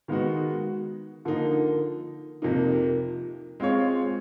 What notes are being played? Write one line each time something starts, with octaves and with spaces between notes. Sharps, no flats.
D#3 G#3 B3 D#4 F#4
D3 F3 A#3 D#4
F2 C3 F3 A#3 D#4
G#3 C4 F4 G#4 C#5